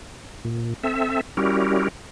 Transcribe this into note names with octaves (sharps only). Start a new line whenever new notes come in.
A#2
C4 A4 E5
G3 C#4 E4 F#4 G4 A#4